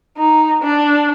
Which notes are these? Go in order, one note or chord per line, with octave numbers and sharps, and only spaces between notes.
D#4
D4